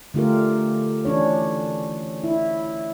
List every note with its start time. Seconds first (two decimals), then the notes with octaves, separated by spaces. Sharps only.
0.14 D3 A3 F4 G4 A#4
1.05 E3 C#4 D4 C#5
2.24 E4